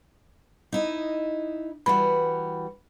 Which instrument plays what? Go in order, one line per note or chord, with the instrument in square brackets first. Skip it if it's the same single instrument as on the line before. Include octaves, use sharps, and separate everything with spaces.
[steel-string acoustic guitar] D#4 E4 D#5
[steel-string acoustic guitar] E3 G3 F#4 [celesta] B5